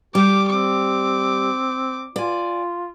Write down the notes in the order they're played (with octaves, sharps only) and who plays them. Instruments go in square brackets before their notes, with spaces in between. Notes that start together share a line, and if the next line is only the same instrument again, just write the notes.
[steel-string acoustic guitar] G3 [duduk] G4 [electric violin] D6
[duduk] C4 [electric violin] D6
[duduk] F4 [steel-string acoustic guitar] D5 G#5